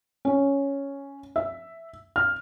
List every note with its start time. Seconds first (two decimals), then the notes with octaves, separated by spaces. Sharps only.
0.25 C#4
1.36 E5
2.16 F6